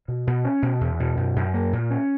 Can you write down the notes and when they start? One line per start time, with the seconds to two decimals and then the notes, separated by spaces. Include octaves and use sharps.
0.08 B2
0.27 B2
0.45 C#4
0.62 B2
0.81 E2
1.00 B2
1.17 F#2
1.36 F#2
1.54 A#3
1.73 A#2
1.91 C#4